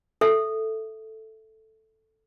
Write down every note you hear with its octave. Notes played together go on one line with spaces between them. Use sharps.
A4 E5